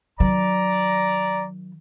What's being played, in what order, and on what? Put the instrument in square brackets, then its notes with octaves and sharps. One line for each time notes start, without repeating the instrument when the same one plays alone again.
[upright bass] D#3 F#3 [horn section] D5 A#5